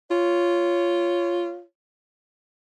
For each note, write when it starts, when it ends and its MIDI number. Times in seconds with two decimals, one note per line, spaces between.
0.11 1.63 65
0.11 1.63 73